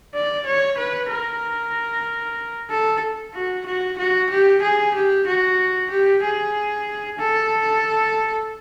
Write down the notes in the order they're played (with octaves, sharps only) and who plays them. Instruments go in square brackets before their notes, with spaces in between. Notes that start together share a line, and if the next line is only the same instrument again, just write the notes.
[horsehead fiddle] D5
C#5
B4
A#4
A4
F#4
F#4
F#4
G4
G#4
G4
F#4
G4
G#4
A4